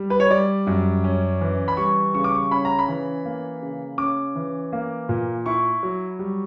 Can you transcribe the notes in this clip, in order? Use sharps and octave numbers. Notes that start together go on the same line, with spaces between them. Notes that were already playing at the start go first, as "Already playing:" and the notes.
Already playing: G3
B4
C#5
G3 D5
F#2
C#4
E3
B5
G3 C#6
C#3 C#6
D6
C#6
C#4 B5
A#5
B5
E3
A#3
C#3
C#4 D6
E3
A#3
A#2
E4 C#6
F#3
G3